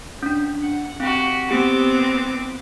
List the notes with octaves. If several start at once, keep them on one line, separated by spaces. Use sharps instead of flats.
C#4 D4
F#5
C4 F#4 G4
B3 C4 G4 D6
A#6